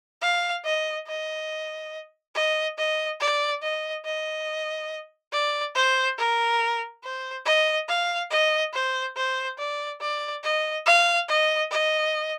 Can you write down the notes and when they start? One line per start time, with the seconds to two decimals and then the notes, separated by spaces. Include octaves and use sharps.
0.22 F5
0.65 D#5
1.07 D#5
2.35 D#5
2.78 D#5
3.20 D5
3.62 D#5
4.05 D#5
5.32 D5
5.75 C5
6.18 A#4
7.03 C5
7.45 D#5
7.88 F5
8.31 D#5
8.73 C5
9.16 C5
9.58 D5
10.01 D5
10.44 D#5
10.86 F5
11.29 D#5
11.71 D#5